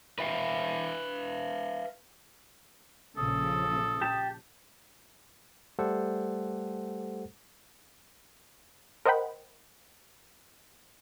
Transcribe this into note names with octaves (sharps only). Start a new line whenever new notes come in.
B4 E5 F5
A#1 C#3 F3 A4 D#6
G4 A5
G3 A3 G4 A4 C5 F#5
A#4 C5 D#5 F#5 G5 B5